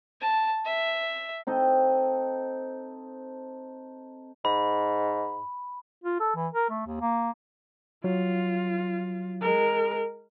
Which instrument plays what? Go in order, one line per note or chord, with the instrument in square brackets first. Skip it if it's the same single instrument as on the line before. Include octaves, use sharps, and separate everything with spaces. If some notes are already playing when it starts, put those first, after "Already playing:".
[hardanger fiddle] A5
E5
[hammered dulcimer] C4 D#4 A4 D#5
[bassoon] G#2 [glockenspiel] B5
[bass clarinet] F4
A4
E3
A#4
A3
D#2
A#3
[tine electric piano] F#3 [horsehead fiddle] F4
[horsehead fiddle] G#3 A#4